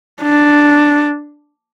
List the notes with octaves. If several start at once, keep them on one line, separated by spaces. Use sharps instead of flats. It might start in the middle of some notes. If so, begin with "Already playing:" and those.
D4